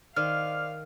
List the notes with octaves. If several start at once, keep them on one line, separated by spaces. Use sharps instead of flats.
D#3 C5 D5 F5 D6 F6